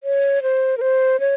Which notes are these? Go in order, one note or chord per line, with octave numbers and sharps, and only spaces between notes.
C#5
C5
A#4
C5
C#5